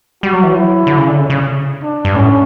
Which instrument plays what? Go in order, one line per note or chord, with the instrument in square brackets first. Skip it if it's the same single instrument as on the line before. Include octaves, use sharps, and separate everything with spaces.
[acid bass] G3 [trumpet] F#4
[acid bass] F#3
E3
[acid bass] F#3 [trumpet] E4
[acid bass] D3
C#3
D3
C#3
C#3
[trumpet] D4
[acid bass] G2
[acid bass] A2 [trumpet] C#4